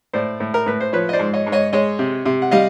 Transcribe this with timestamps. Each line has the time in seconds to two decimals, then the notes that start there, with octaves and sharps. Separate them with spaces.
0.13 A2 C5 D5
0.40 A2
0.54 A#4
0.66 A2 B4
0.80 C5
0.93 F3 B4 C#5
1.09 D#5
1.13 C5 D5
1.19 G#2
1.34 C#5 D#5
1.47 G#2
1.52 C#5 D#5
1.73 G#3 C#5 D#5
1.99 C3
2.26 C3
2.42 F#5
2.51 G3 D#5 F5